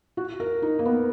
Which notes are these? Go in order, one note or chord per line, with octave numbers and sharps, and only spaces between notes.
F#4
A#4
D#4
A#3
B3